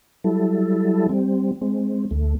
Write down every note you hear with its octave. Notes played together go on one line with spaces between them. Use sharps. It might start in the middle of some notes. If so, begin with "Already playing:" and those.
F#3 G3 E4 A4
G3 C4
G#3 C4
D2 A3